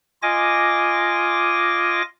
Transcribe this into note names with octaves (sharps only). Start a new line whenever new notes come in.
F4 D#5 G#5 D6 A#6